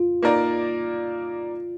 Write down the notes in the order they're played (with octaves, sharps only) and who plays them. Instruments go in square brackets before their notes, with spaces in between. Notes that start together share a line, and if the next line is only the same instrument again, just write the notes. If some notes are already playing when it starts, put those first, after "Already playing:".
Already playing: [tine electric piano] F4
[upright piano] A#3 D#4 A#4 D5